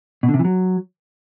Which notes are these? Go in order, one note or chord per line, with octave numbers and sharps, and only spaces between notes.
B2
D3
C3
E3
F#3